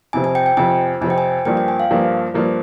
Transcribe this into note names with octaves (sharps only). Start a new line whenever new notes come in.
F2 C3 F3 C4 G#5
G#5
G5
G5
F2 C3 F3 C4 G#5
F2 C3 F3 C4 G#5
G5
G#5
G2 F3 A#3 G5
G5
G#5
F5
G2 F3 A#3
G2 F3 A#3